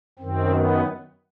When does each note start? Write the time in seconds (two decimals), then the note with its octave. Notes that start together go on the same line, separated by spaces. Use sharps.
0.19 F#2 D#3 C4
0.49 B3